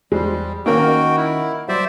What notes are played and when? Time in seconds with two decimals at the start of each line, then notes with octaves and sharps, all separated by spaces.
0.12 E2 G3 G#3 C5
0.66 D#3 A#3 C#4 D#4 F#4 A#4 G5
0.83 D#5 F#5
1.17 E4
1.69 F#3 G3 C5 D5 E5